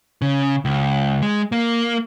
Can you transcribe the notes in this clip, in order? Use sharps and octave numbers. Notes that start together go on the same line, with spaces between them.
C#3
C#2
G#3
A#3